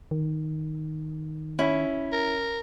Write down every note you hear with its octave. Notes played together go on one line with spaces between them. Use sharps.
D#3
C#4 E4
A#4